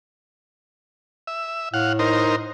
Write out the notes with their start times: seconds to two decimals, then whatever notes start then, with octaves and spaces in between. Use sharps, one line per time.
1.27 E5
1.74 A2 F5 F#5
1.99 D#4 A#4 C5